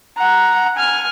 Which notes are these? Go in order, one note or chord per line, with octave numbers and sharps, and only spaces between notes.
F#5 A#5
G#5 F6